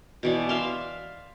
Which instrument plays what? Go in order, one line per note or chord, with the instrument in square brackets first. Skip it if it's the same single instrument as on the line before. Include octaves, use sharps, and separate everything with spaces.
[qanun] B2 E3 D5
E5 F5 C6